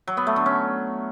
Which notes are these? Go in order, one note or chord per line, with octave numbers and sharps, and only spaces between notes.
F#3
B3
A3
D3
C#4